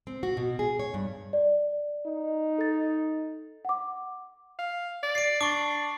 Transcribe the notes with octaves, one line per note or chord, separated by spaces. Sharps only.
C4
F#4
B2
G#4
C#5
G2
D5
D#4
A4 A6
F#5 D6
F5
D5
C7 D7
D4 C#6 D6